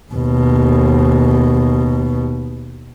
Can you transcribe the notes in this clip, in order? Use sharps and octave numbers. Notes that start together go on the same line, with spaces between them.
D#2 B2